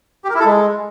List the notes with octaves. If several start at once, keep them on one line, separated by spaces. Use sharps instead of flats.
G4
A#4
E4
A4
G#3